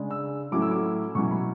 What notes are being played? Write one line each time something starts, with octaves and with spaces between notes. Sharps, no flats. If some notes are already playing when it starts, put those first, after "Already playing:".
Already playing: C#3 G#3 D4
E6
A2 F#3 A3 C#4 E4 D6
E6
D6
B2 F#3 C#4 E4 C#6
B5